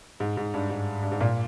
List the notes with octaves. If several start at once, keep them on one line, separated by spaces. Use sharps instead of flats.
G#2
G#2
G2
G#2
G2
G#2
A#2